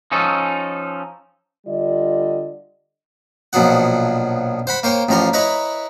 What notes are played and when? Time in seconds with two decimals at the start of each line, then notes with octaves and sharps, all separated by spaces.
0.12 F3 C#4 D#4 A4
1.66 D3 G3 F4 D5 D#5
3.53 A#1 B2 F3 F#3 G#4 F#5
4.67 C5 F#5 B5
4.83 A#3 C5 C#5 G5
5.09 A1 A2 F3 C#5 A#5 C6
5.33 E4 B4 C#5 D#5 A#5